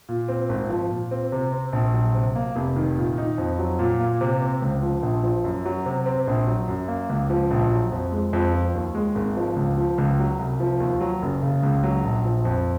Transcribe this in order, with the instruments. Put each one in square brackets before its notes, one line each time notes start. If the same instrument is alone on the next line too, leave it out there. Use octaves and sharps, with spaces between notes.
[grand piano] A#2
C4
G#1
F3
A#2
C4
C3
C4
A#1
F#3
C3
A#3
F1
D#3
A#2
D#4
F2
F#3
A#2
A#3
C3
C4
C#2
F3
A#1
F3
F#2
F#3
C3
C4
A#1
F#3
F#2
A#3
C#2
F3
A#1
F#3
F2
G#3
F2
F3
D#2
G#3
G#1
F3
C#2
F3
C#2
F#3
C2
F3
D#2
F#3
F#1
C#3
C#2
F#3
A#1
F3
F2